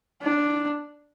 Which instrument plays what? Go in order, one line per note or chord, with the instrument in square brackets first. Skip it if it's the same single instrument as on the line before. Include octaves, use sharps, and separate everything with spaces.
[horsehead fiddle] D4